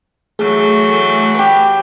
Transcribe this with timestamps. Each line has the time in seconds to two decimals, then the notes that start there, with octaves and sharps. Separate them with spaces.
0.39 E3 F#3 A3 G#4
1.35 G4 B4